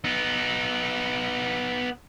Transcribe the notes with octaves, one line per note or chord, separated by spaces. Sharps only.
B3 D#4